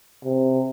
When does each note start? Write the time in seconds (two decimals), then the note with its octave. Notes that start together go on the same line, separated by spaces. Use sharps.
0.25 C3